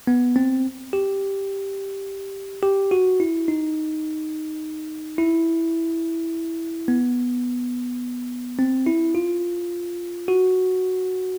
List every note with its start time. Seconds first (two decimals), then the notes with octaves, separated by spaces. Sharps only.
0.07 B3
0.36 C4
0.93 G4
2.63 G4
2.91 F#4
3.20 E4
3.48 D#4
5.18 E4
6.88 B3
8.59 C4
8.86 E4
9.15 F4
10.28 F#4